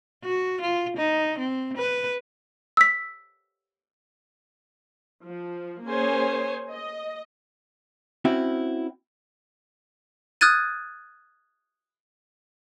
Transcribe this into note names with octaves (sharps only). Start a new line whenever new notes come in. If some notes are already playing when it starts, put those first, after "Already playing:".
F#4
F4
D#4
C4
B4
E6 B6
F3
A#3 C#4 G#4 C5 C#5 G#5
D#5
C4 C#4 E4 F#4
D#6 F6 F#6 G#6 A6 D#7